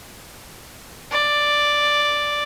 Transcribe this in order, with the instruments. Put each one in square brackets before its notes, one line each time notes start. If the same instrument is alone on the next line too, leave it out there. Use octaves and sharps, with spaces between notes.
[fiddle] D5